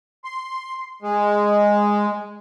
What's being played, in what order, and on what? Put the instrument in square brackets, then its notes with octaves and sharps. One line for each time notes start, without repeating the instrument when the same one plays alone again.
[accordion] C6
G#3